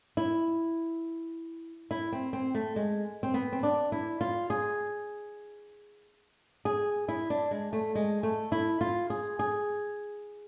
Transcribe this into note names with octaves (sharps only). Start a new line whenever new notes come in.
E4
E4
C4
C4
A3
G#3
C4
B3
C4
D4
E4
F4
G#4
G#4
E4
D4
G#3
A3
G#3
A3
E4
F4
G#4
G#4